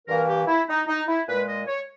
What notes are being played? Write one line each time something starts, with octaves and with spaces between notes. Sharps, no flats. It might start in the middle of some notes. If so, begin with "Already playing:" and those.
G2 E3 A#3 A#4
G4
E4
D#4
D#4
E4
A#2 G#3 B4
D#5
C#5